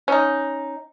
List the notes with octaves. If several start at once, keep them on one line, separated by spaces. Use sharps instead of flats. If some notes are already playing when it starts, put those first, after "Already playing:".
C#4 D#4